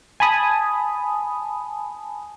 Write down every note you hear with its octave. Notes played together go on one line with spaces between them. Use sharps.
G#5 A5 B5 D#6